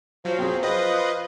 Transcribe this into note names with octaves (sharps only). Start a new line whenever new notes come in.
F3 F#3
F3 C4 G#4
F4 B4 C5 D#5